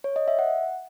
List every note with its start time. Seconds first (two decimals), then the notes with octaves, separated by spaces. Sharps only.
0.04 C#5
0.16 D#5
0.28 E5
0.39 F#5